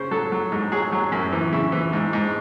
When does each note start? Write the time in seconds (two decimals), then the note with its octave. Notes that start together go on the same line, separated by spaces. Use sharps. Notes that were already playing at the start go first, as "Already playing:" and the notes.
Already playing: C#3 C5
0.11 F#3 A4
0.32 F#3
0.52 G#2
0.72 F#3 G#4
0.92 F#3
1.12 F#2
1.32 E3
1.52 C#3 E4
1.72 E3
1.93 G#2
2.13 G#2